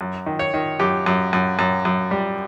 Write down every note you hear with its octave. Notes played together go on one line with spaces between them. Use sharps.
F#2
D#3
C#5
D#3
F#2 G4
F#2
F#2
F#2
F#2
G3